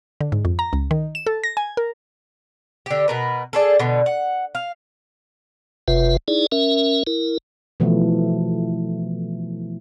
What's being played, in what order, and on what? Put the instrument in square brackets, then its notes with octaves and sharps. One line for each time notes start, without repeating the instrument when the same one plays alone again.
[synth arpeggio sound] D3
G#2
F2
A#5
C#2
D#3
E7
A4
A#6
G#5
A#4
[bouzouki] D3 G4
B2 A#4 B4
D4 G#4 A4
B2 D3
F#5
F5
[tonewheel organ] F#1 C3 F4 B4 E5
D#4 E4 G#4 D5
C#4 A#4 E5
E4 A#4
[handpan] B2 E3 F3 A3